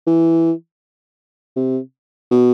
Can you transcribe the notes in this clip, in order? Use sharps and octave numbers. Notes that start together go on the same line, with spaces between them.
E3
C3
B2